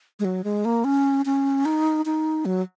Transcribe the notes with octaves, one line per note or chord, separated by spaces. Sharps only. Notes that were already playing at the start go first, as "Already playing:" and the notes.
G#3
F#3
G#3
A#3
C#4
C#4
D#4
D#4
F#3